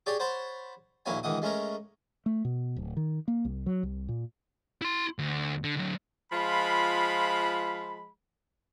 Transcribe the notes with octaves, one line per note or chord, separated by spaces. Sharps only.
G4 G#4 C#5 D5 G5 A5
C5 C#5 F#5 A5 B5 C6
A#1 D#2 A#3 E4 C#5 G#5
C#2 D#3 E3 F#5 D#6
G#3 A3 C#4 A#4 C#5
A3
B2
D1
D#3
A#3
C2
F#3
C2
A#2
E4 C6
D2
D3
D3 F#3
F3 G#3 F4 B5